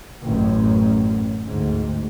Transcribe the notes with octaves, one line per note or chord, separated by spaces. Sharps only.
A1 F#2
D2 G#2